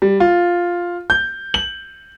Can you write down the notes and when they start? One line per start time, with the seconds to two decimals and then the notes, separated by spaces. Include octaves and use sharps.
0.02 G3
0.20 F4
1.10 G6
1.54 F#7